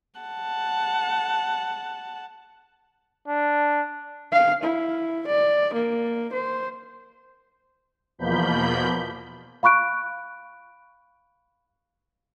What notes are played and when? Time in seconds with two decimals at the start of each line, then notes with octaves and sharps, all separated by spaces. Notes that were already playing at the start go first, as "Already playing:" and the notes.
0.20 F#5 A5
3.28 D4
4.33 F5
4.63 E4
5.27 D5
5.74 A#3
6.32 C5
8.18 E2 B2 F3 A#3 B5 G6
9.63 F5 B5 C#6 F#6 D7